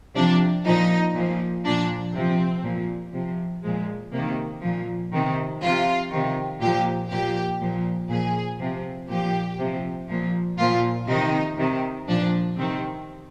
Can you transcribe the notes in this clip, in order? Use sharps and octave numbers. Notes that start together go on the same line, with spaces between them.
C3 F3 D4
A#2 F3 D#4
A#2 F3
A#2 F3 D4
C3 F3 C4
A#2 F3
C3 F3
A#2 F3 G#3
C3 D#3 A#3
A#2 F3
C3 D#3
C3 F3 F4
C3 D#3
A#2 F3 G4
A#2 F3 G4
A#2 F3
A#2 F3 G#4
C3 F3
A#2 F3 G4
C3 F3
A#2 F3
A#2 F3 F4
C3 D#3 D#4
C3 D#3
A#2 F3 D4
C3 D#3 C4